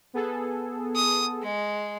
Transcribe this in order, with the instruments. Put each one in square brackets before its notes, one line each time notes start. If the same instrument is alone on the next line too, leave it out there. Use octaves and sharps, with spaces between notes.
[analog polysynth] B3 G#4 A4
[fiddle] D#6
G#3